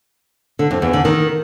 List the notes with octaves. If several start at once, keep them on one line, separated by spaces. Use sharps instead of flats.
D3
F2
E2
D3
D#3